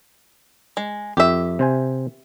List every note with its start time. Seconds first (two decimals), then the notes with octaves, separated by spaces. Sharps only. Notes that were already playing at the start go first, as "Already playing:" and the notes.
0.77 G#3
1.17 F2 G4 E5
1.59 C3 C5 G#5